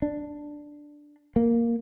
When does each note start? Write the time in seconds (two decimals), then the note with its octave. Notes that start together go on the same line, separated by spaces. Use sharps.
0.02 D4
1.36 A#3